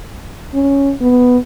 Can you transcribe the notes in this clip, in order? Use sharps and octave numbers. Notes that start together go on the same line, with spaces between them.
C#4
B3